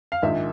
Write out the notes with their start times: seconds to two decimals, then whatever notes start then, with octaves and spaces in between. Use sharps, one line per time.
0.12 F5
0.22 A#1 G#2 D#3 E5